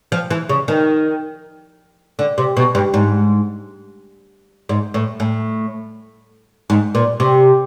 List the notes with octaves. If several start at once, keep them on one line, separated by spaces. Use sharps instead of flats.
F3
E3
C#3
D#3
D3
C3
B2
G2
G#2
G#2
A2
A2
G#2
A#2
C3